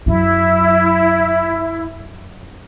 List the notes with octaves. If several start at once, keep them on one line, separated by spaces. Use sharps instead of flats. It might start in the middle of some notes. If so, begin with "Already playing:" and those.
F#2 F#3 E4